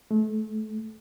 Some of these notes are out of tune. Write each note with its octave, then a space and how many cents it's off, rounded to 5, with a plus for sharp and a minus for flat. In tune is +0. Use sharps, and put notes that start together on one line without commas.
A3 -30